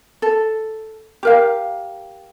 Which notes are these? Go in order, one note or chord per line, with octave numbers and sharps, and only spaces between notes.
A4
G4 A#4 F5